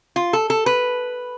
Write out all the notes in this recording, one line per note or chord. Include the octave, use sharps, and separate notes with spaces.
F4
A4
A4
B4